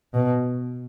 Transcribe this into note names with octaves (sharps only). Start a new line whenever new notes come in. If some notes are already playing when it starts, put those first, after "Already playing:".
B2